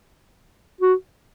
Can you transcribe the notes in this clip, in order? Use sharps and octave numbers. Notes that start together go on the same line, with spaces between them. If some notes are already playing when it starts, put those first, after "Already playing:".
F#4